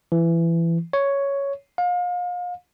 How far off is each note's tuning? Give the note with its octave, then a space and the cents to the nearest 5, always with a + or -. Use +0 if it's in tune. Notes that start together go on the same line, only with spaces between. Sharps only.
E3 +20
C#5 +5
F5 +35